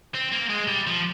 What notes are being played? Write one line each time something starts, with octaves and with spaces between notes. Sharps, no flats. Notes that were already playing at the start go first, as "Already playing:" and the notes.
C4
A#3
G#3
G3
F3